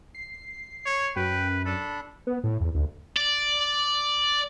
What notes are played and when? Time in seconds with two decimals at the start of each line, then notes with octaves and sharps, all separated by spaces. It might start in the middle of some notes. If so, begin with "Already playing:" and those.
0.15 C7
0.86 C#5
1.16 F#2 B4 G5
1.65 D4 A4 B5
2.27 B3
2.44 A2
2.60 E2
2.74 D2
3.17 D5